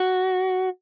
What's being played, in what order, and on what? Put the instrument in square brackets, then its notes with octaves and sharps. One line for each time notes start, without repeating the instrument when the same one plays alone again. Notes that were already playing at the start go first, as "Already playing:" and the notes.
Already playing: [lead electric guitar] F#4